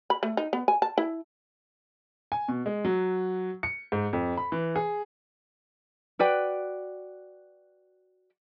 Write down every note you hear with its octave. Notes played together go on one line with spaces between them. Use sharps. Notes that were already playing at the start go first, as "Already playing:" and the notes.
B5
A3
D#4
B3
G#5
A5
E4
G#5
B2
G#3
F#3
C#7
G#2
F2
B5
E3
G#4
F#4 B4 D5 G5